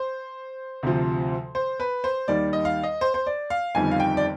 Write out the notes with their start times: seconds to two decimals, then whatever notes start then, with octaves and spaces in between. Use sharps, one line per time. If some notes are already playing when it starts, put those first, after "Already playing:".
Already playing: C5
0.83 D2 C3 F3
1.55 C5
1.80 B4
2.04 C5
2.28 D#2 D#3 G3 D5
2.53 D#5
2.65 F5
2.83 D#5
3.01 C5
3.14 C5
3.27 D5
3.50 F5
3.75 G1 F2 D#3 G3 G#5
3.91 F5
4.00 G5
4.17 D5